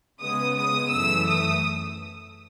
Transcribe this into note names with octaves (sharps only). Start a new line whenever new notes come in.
C#3 G#3 B3 D#6
D#6
F#2 E3 A3 E6
D#6